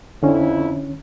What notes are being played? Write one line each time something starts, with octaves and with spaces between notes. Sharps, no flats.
F2 D3 C#4 E4